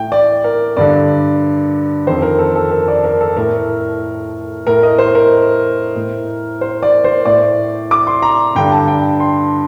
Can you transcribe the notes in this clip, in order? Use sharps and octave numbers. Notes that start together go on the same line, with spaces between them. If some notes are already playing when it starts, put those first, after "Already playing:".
Already playing: A2 G5
D5
A#4
G2 D3 D5
F2 D#3 C5
A#4
A4
A4
A#4
D5
A#4
A4
A2 A#4
A2 A#4
D#5
C5
A#4
A2
C5
D5
C5
A2 D5
D6
C6
A#5
G2 D3 G5
A5
G5
C6